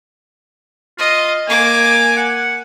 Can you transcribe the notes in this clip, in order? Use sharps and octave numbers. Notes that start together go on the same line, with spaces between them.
F4 D#5
A#3 G#5 D6
F#5